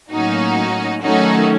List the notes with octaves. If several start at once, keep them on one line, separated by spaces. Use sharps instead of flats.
A2 F#3 A#3 C#4 D#4 F#4
D#3 F#3 A3 C#4 D#4 F#4